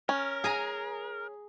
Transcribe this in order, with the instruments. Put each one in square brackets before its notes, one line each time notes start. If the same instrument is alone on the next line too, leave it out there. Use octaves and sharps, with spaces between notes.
[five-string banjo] C#4 [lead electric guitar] A#4
[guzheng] G#4 G#5 A#5